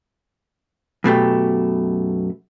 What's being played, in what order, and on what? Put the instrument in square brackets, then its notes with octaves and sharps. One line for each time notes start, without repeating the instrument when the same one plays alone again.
[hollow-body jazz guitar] F#2 B2 A3 G4